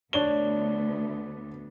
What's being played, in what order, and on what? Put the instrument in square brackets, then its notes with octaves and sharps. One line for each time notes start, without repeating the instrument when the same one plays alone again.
[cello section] D2 B3 [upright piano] D4 C#5 G7